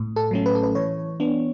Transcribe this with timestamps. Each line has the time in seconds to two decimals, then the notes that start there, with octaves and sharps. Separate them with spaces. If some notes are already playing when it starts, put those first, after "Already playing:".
Already playing: A2
0.16 A4
0.31 F#3 A3 C#4
0.46 B4
0.55 A4
0.63 B4
0.75 E3 C#5
1.20 B3 D4